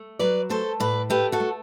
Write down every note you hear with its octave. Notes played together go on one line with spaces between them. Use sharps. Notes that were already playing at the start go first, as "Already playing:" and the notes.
Already playing: A3
F#3 B4 D5
A3 A4 C5
A2 B4 D5
A3 G4 B4
F#4 A4
A3